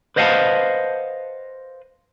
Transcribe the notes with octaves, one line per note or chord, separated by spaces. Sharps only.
B4 C5 D#5 F5 F#5 A5